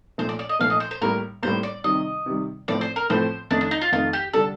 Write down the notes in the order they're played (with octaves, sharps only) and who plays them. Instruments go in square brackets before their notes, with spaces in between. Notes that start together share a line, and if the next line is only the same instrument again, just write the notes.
[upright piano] A#2 F3 A3 [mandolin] C5
[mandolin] D5
D5
D#5
[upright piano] A#2 F3 A3 [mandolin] F5
[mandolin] D#5
C5
C5
[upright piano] A2 G3 A#3 [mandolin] A#4
[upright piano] A2 G3 A#3 [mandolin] C5
[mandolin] D5
[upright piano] C3 D#3 G3 [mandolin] D#5
[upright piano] C3 D#3 G3
[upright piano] A2 F3 A3 C4 [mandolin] D5
[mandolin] C5
A#4
[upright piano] A2 F3 A3 C4 [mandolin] C5
[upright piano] F2 D#3 A3 D#4 [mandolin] D4
[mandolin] D4
D#4
F4
[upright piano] F2 D#3 A3 D#4 [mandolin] F4
[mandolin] G4
[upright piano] D3 G3 D4 [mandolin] A4